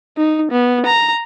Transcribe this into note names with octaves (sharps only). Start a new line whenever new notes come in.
D#4
B3
A#5